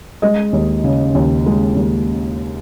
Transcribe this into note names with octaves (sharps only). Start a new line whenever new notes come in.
G#3 D#5
D#2
C#3
D#2
G#3
D#2